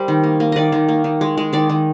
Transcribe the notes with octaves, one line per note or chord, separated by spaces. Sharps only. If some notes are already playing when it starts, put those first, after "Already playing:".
Already playing: G3 A#4 C5
D#3
A#3
A#3
D#3 D5 D#5
D#3
A#3
D#3
G#3
G#3
D#3 D5
D#3